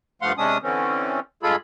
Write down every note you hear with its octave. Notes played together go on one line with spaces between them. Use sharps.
G2 F3 A3 F5 F#5 C6
C3 G#3 C#4 D4 D#6
D3 E3 C4 C#4
G2 G#3 F4 G#4 A4 B5